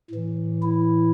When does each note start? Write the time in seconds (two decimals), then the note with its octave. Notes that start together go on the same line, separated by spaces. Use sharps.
0.11 A2 E3
0.63 E4